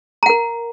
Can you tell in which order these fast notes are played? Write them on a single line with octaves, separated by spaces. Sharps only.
A#5 F#5 A#4